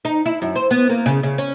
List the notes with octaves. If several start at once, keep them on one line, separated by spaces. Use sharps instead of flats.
D#4
E4
F#2
C5
B3
A#3
C#3
C#3
C#4